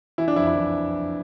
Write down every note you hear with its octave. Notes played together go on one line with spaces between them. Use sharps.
E3 E4
D4
F2 E4
E4
E3